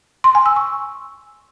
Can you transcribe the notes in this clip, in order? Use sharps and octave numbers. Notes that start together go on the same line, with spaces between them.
C6
G#5
E6
C#6